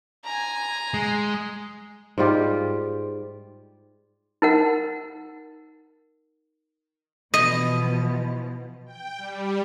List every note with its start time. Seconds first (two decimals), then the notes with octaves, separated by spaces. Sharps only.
0.24 G#5 A#5
0.94 G#3
2.18 G#2 G3 F4 G4
4.42 D#4 A#4 F#5
7.34 B2 E3 F3 D#5
8.86 G5
9.18 G3